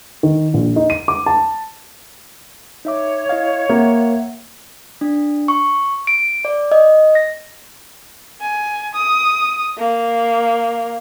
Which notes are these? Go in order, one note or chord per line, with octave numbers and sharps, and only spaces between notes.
D#3
A#1
D#4
D#7
D6
A5
D#4 C#5 E5 D6
E4 D#5 F5
A#3 E5 F#5
D4
C#6
D7
D5
D#5
A#6
G#5
D#6
A#3